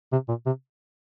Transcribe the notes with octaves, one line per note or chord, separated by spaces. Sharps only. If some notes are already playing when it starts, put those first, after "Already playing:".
C3
A#2
C3